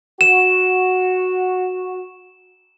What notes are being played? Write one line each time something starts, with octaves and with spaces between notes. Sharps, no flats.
F#4 E7